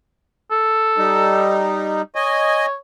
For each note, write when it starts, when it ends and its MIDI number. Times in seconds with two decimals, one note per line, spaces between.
0.51 1.63 69
0.98 2.02 55
0.98 2.02 63
2.16 2.75 73
2.16 2.66 75
2.16 2.66 80